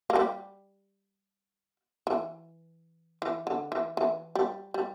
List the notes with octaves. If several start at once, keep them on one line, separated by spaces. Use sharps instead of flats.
A#3
G3
E3
E3
D3
E3
E3
G3
G3